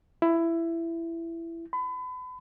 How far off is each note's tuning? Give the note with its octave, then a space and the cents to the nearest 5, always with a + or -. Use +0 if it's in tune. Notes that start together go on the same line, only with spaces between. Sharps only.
E4 +15
B5 +35